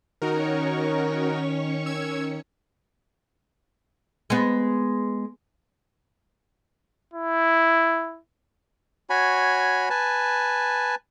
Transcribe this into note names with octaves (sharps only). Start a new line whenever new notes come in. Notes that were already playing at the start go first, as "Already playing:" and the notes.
D#3 C#4 D#4 F#4 A#4 C#5 C#6
E6 G#6
G#3 B3
E4
F#4 C#5 G#5 B5
B4 G#5 A5